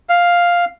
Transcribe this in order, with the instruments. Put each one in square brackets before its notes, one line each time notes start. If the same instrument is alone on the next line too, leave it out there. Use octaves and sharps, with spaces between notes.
[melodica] F5